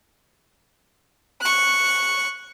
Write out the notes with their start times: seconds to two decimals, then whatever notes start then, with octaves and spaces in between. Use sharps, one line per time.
1.41 C#6 F#6